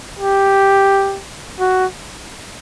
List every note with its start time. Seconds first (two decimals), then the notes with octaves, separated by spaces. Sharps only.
0.19 G4
1.60 F#4